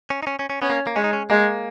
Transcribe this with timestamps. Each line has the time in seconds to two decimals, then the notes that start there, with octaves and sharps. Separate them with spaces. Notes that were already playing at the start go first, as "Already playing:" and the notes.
0.10 C#4
0.23 D#4
0.27 C#4
0.39 C#4
0.50 C#4
0.62 B3 C#4
0.70 A#3
0.87 A#3
0.95 G#3 C#4
1.04 D#4
1.13 C#4
1.30 G#3 A#3